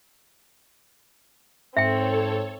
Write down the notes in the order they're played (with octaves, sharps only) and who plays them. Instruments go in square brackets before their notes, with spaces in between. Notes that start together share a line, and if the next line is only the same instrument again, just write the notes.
[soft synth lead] G#2 [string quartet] C4 [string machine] A4 C#5 [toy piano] E5 G5